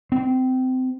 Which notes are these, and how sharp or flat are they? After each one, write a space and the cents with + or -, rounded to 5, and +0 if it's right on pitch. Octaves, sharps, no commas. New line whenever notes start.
C4 -25